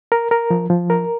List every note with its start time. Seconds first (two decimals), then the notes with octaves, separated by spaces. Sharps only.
0.12 A#4
0.31 A#4
0.50 F3
0.70 F3
0.90 A#4